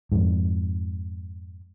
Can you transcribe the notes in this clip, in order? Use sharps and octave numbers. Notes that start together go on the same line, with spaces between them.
F2 G#2